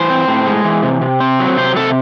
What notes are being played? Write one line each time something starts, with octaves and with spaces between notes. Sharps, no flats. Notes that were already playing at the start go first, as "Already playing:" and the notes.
Already playing: E3 C5
C4
A2
G#3
E3
C3
C3
C4
F#3
C3 C5
C3 A4